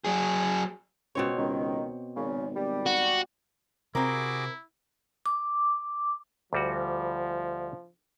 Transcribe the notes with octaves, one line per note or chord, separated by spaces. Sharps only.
F#3 G#4
C#2 B2 C4 C#5
C#2 D#3
G#1 A#2 C#3
G3
F#4
C3 C4 E4 F#4 G#4 A#4 D6
D6
D2 F3 G3 F#4